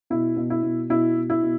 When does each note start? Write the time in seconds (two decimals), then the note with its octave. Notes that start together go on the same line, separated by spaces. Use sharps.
0.10 B2 E4
0.36 B2
0.50 E4
0.63 B2
0.90 B2 E4
1.16 B2
1.30 E4
1.43 B2